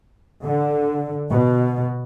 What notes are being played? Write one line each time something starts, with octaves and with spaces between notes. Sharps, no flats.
D3
B2